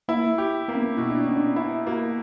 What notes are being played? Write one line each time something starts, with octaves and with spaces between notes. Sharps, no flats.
A#3 E4
G4
A#3 B3
C#4
B3
B2 E4
D4
B2 C#4
D4
E4
A#3 F#4